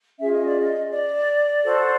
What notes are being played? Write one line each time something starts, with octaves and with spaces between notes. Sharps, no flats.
C#4 F4 G#4 E5
D#5
D5
D#5
D5
F#4 A4 C5